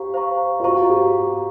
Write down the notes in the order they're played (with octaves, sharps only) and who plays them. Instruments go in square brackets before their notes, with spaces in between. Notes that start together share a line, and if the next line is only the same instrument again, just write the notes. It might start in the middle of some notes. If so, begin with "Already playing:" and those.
Already playing: [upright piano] G4 [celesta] C5 F5 A#5 C#6
[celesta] C5 F5 A#5 C#6
[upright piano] F4
[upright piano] F#4 [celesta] C5 F5 A#5 C#6
[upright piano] G4